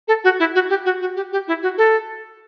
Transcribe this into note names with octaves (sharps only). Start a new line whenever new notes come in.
A4
F#4
E4
F#4
G4
F#4
F#4
G4
G4
E4
F#4
A4